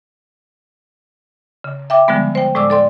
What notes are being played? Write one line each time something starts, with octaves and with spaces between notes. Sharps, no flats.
C#3
E5 G5 D6
D3 F3 G3 G#3 B3
C5 G5
A2 G#3 D5 D6 E6
D#2 A4 D5 C6